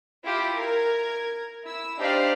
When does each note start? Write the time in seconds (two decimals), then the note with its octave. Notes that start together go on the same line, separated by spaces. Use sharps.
0.24 E4 F4 G4 E5
0.58 A#4 G#6
1.65 E4 E6
1.99 D4 D#4 G4 C5 D5 F5